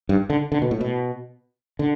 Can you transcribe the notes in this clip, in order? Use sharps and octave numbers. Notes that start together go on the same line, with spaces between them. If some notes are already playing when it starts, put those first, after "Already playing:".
G2
D3
D3
B2
A2
B2
D3